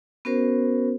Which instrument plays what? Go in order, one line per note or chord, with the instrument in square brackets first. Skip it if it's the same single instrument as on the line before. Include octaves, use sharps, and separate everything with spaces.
[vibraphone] B3 C#4 F#4 A#4 C5